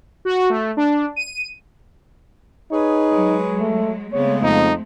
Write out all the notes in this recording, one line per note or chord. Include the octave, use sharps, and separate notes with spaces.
F#4
A3
D4
D#7
D#4 G#4 B4 C#5
F#3 G#3
A3
C#3 G#3 A3 B3 C4 C#5
F2 D#4